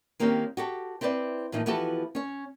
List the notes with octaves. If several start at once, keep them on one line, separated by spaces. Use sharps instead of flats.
D#3 A#3 C4 C#4 G4
F#4 G4 A4
C4 E4 B4 C5 D5
A2 E3 F3 A#3 D#4
E3 F3 B3 F#4 G4 A4
C#4 C#5